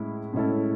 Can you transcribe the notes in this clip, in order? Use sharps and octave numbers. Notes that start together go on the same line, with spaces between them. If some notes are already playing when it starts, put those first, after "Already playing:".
Already playing: A2 G#3 C#4 E4
A2 G#3 C#4 E4 A4